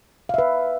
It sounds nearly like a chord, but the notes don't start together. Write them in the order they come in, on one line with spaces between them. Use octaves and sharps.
F5 E5 B4